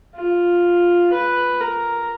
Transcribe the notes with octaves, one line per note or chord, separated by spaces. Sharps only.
F4
B4
A#4